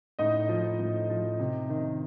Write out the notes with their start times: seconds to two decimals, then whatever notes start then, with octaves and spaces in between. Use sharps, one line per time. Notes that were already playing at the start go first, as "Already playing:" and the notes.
0.19 A2 D#4 D#5
0.49 F3
0.79 A2
1.10 F3
1.39 C3
1.69 D#3